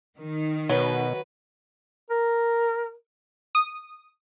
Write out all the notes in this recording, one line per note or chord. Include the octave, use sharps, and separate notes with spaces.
D#3
B2 F#3 B4
A#4
D#6